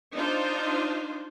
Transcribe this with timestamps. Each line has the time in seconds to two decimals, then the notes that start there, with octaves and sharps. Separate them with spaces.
0.14 D4 D#4 F4 C5